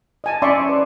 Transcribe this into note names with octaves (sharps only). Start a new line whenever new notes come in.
D#5 G#5 A5
C#4 D5 E5 C6 C#6
B4 D5